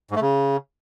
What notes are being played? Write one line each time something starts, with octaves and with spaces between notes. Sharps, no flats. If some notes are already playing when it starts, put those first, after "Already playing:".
G#2
A3
C#3